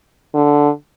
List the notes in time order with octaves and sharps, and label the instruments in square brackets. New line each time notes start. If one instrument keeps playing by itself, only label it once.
[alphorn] D3